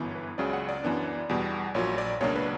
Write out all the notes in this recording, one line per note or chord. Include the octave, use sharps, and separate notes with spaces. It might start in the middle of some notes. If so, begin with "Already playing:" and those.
Already playing: G1 F#2 E3 B3
B4
C#2 C#3 F#3 C#4 D5
F#5
D5
F#2 E3 B3 D4
E2 B2 G3
A#1 A#2 F#3 C#5
D5
C#2 B2 F#3 A#3 D4 C#5
B4